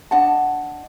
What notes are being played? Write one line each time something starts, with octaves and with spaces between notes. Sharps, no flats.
D4 D#5 F#5 A5